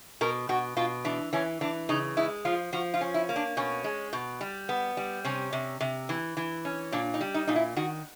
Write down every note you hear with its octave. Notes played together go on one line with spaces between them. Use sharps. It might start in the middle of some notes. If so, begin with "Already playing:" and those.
B2 A#4
B2 F#4
B2 F4
E3 D4
E3 C#4
E3 D4
C#3 D#4
G#3 E4
F3 F4
F3 F#4
F4
C#4
E4
A#3
D4
B2 C#4
G#3
B2
G3
B3
G3
C3 C#4
C3
C3
E3
E3
C#4
A#2 D4
D#4
G3
D#4
A#2 D#4
E4
D#3 F#4